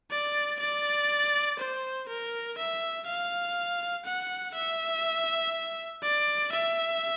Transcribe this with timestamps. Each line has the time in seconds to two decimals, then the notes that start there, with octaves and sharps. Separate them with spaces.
0.10 D5
0.60 D5
1.59 C5
2.08 A#4
2.58 E5
3.06 F5
4.05 F#5
4.54 E5
6.03 D5
6.52 E5